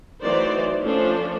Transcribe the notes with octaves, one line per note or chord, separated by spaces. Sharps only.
E3 F#3 A3 D#4 C5 D5
F3 A3 C#4 D4 C5